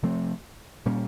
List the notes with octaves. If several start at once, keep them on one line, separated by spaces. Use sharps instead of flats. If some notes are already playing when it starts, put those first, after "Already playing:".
C3 F3 A3 C4
A#2 G3 A#3 C#4